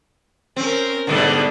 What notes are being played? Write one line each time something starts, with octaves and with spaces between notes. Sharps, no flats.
C4 C#4 A#4
G#2 B2 D3 G3 B3 A4